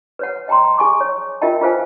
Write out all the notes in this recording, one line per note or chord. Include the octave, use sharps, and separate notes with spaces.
B4 C#5 F#5
D#5 G5 A5 A#5 C6
G#4 G#5 C#6 D6
C#5
F4 A#4 D#5 E5 G5 A5
F4 G#4 B4 C5 F5 G#5